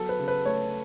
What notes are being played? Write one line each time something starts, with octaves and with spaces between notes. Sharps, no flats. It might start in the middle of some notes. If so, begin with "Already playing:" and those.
Already playing: F#3 B3 A4
B4
C#3
B4
A3 C#5